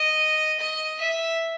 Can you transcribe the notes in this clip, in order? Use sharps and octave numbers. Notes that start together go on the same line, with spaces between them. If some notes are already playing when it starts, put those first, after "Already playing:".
Already playing: D#5
D#5
E5